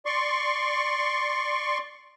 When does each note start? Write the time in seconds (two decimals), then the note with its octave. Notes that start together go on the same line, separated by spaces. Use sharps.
0.06 D5 C6 C#6